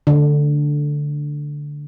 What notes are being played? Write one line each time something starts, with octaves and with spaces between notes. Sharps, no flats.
D3